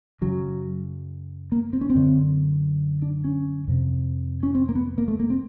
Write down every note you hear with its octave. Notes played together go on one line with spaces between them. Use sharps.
F#2 C#3 F#3
A#3
C4
C#4
C4
F#2 D3
D4
C#4
F2 C3
C#4
C4
A#3
B3
A#3
A3
A#3
C4